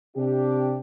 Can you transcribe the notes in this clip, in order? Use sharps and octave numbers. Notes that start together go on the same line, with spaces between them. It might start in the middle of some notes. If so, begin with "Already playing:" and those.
C3 D4 G4